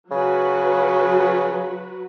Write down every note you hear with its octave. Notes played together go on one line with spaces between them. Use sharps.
C#3 F#3 F#4 B4